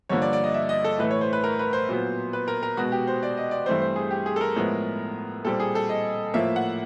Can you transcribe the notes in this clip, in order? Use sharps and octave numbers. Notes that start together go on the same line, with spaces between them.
G2 D3 F3 A#3 C#5
D5
D5
D#5
E5
D#5
A4
A2 E3 A3 B4
C#5
C5
B4
A#4
B4
C5
A#2 F#3 B3
B4
A#4
A#4
B2 G#3 B3 F#4
G4
C5
D5
D#5
D5
G2 E3 A3 C4 C5
C5
G#4
G4
G#4
A4
A#4
A2 F3 G#3 B3
A#2 G3 C4 A4
G#4
A4
D#5
A2 F3 A#3 E5
F#5